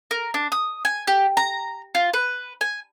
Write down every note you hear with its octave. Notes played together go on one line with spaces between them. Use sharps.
A#4
D4
D#6
G#5
G4
A#5
F4
B4
G#5